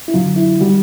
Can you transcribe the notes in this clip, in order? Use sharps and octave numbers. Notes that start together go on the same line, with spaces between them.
E4
F#2 D3 F#3 F4
E4
D#3 G3 F#4